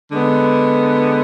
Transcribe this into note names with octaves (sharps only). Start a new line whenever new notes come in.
D3 G#3 B3